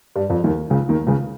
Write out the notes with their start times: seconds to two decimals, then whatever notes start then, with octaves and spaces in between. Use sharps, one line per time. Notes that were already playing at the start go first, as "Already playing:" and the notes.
0.16 G2 G3
0.29 F2 F3
0.44 D#2 D#3
0.70 C#2 C#3
0.89 D#2 D#3
1.07 C#2 C#3